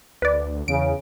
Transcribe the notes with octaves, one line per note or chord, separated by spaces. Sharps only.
D2 B4 D5
E2 C#3 D7